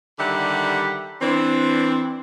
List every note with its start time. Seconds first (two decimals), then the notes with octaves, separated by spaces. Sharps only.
0.19 D3 D#3 G3 G4 E5 F#5
1.21 E3 C4 D4